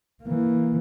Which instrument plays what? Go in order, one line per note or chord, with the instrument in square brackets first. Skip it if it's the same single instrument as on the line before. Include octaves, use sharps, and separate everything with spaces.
[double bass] E3 A#3